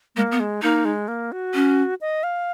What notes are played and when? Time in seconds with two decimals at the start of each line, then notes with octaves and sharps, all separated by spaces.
0.16 G#3 A#3
0.32 B3
0.40 G#3
0.62 A#3 D#4
0.85 G#3
1.08 A#3
1.32 F#4
1.54 C#4
2.01 D#5
2.23 F5